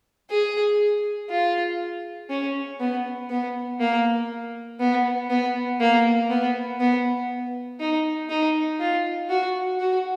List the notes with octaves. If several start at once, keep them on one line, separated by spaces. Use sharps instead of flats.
G#4
F4
C#4
B3
B3
A#3
B3
B3
A#3
B3
B3
D#4
D#4
F4
F#4
F#4